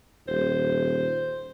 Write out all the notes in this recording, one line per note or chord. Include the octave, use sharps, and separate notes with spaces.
D#1 C5